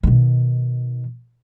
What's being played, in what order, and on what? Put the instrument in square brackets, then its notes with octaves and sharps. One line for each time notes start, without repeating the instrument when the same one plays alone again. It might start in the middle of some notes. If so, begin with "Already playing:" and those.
[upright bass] B2 D#3